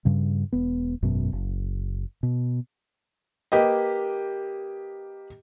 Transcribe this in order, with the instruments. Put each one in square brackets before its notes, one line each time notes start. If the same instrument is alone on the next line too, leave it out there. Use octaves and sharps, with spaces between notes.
[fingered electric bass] G2 C#3 G3
E1 B3
G#1 F#2 B2
F#1
B2
[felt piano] A#3 G4 B4 D#5